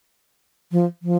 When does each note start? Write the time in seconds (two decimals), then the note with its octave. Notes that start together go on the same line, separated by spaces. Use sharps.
0.72 F3
1.02 F3